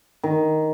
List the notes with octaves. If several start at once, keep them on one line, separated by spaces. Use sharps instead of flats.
D#3